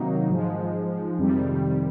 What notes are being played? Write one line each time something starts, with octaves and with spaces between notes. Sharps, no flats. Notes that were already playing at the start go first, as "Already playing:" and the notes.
Already playing: C3 D#3 F#3 A#3 D#4
G#2 F3 G#3
F2 C3 D#3 G3